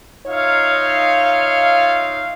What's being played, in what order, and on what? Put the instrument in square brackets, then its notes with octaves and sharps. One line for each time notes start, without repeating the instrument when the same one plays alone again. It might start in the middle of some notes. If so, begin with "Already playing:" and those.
[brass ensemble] D#4 F4 C#5 E5 F5